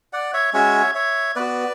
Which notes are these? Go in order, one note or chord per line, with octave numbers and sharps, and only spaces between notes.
D5 F#5
C#5 E5
G#3 C#4 F#4 C#5 E5
C#5 E5
B3 F#4 B4 D5